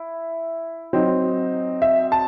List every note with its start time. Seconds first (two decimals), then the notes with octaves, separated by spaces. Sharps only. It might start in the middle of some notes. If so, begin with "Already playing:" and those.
Already playing: E4
0.93 F#3 C4 D#4
1.82 E5
2.12 A5